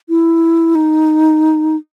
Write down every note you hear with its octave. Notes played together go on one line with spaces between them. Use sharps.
E4
D#4